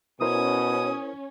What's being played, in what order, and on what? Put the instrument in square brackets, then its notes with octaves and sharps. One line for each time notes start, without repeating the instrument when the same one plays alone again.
[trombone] B2 [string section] C#4 [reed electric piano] E4 A#4 C5 [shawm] D#6